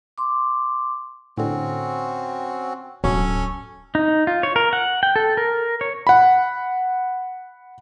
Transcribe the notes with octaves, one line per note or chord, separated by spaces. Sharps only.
C6 D6
A2 D3 C4 C#4 F#4
D1 F#3 C#4 A4
D#4
F4
C#5
A#4
F#5
G5
A4
A#4
C#5
F#5 B5